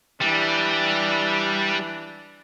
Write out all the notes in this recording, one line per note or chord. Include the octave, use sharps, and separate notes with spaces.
E3 G3 D4